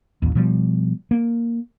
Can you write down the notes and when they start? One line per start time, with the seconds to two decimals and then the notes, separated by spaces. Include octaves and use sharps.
0.22 A1 D#2
0.35 B2 F3 G3
1.11 A#3